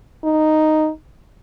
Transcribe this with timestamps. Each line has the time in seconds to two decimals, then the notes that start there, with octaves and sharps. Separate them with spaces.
0.24 D#4